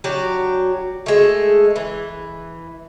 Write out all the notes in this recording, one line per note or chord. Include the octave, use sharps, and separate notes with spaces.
F#3 D4 G4
G#3 A3
E3